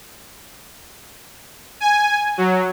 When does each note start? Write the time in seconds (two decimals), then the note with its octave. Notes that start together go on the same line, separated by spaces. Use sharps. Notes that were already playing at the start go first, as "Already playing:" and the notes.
1.80 G#5
2.38 F#3